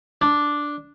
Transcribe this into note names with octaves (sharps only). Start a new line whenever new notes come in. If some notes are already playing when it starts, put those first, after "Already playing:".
D4